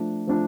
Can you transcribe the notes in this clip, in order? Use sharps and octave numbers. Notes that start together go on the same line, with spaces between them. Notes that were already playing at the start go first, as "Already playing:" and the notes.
Already playing: F3 A3 D4
F3 A3 D4